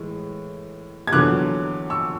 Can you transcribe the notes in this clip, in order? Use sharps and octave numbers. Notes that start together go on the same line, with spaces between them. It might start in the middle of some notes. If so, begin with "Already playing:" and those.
Already playing: A2 E3 G#3
G#6
E2 D3 F#3 D6 F#6
C#6 E6